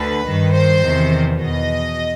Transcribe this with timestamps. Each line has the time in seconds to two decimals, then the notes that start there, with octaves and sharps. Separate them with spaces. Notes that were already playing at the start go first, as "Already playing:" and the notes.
Already playing: D2 D3 B4
0.25 G2 D#3
0.54 C5
0.83 E2 C3 D#3
1.42 E2 B2 D#5